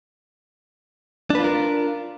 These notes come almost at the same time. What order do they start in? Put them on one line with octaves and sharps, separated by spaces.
D4 B4 F4 A#4